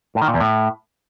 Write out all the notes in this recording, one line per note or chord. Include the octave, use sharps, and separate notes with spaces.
A2
D#3
A#2
E2
A2